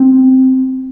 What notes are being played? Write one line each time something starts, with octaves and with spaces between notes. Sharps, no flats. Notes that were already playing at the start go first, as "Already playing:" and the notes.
Already playing: C4